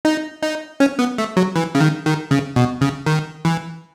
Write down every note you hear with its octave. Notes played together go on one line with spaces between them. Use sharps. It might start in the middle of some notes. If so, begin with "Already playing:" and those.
D#4
D#4
C#4
B3
A3
F#3
E3
C#3
D#3
D#3
C#3
B2
C#3
D#3
E3